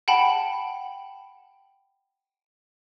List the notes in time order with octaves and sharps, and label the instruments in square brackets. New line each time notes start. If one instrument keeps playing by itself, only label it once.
[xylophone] F#5 G5 A5 B5